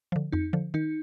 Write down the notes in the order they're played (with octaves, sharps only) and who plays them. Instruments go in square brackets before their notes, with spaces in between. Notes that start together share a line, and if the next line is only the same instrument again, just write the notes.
[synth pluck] D3 F3
[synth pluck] F2 [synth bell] D#4
[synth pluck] D3 F3
[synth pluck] D#3 [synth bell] D#4